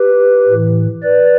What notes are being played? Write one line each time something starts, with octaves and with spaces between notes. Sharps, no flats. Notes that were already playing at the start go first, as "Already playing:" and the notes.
Already playing: G4 B4
A2 E3
B4 D5